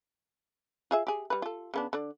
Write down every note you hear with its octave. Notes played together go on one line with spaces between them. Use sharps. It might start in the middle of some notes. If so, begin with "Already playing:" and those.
F4 G#4 E5
G4 G#4
G3 B4
F4 A4
C#3 B3 D4
D3 D4 D5